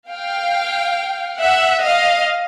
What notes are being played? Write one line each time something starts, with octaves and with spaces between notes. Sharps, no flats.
F5 G5
E5 F#5
D#5 F5